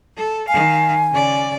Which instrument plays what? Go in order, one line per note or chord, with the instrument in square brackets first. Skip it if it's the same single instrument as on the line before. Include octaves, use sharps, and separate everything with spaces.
[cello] A4
[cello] D#3 F5 [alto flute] G#5
[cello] C#3 D5